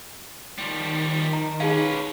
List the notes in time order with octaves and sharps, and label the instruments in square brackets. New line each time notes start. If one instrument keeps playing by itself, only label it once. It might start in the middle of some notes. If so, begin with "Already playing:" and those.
[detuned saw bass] D#3 [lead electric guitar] F3 G3
[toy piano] A#5
[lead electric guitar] C#4 B4 [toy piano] D#4 G#4 F5